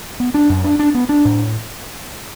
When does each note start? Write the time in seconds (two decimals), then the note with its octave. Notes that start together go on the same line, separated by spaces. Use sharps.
0.20 B3
0.34 D4
0.49 F#2
0.64 D4
0.79 D4
0.95 B3
1.09 D4
1.25 A2